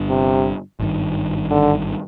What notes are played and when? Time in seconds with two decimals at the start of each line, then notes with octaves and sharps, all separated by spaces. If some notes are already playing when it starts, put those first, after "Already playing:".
Already playing: G1 G2 D3
0.09 C3
0.80 G#1 G2 D#3
1.51 D3